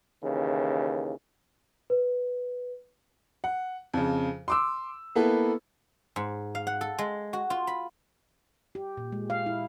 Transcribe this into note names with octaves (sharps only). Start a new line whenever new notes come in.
D#2 C#3 E3
B4
F#5
F2 C#3
C6 D6 E6
A#3 B3 E4 A4 B4
G#2
F5
F#5
A4
G#3
F#4
F4
B5
G4
A#2
G#3
F5
E4